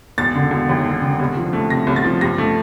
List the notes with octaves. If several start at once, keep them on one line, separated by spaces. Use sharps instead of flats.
E1 A6
D3
E1
D#2
E1
D3
C2
F3
A3
C3 A#6
C2
A6
F3
G2 A#6
A3